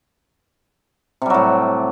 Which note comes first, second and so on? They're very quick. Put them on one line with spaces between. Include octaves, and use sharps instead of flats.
C3 G3 F#3 A2